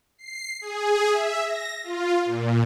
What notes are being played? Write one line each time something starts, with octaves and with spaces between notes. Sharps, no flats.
C7
G#4
E5
A#6
F4
A#2